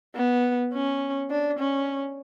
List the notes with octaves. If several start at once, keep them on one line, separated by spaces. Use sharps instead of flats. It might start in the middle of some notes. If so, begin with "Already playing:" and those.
B3
C#4
D4
C#4